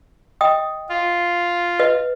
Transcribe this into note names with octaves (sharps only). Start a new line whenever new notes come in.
D#5 G5 D#6
F4
B4 D#5